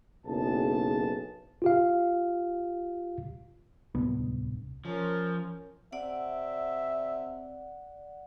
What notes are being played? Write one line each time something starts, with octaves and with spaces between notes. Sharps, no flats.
F#1 B1 G#4 A5
F4 G4 F5
D1 C2 B3 D4
F3 C#4 A#4
C3 D5 E5 F#5